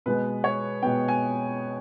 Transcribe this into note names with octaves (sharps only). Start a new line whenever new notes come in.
B2 G#3 B3 B4
C#5
B2 G#3 B3 G5
G#5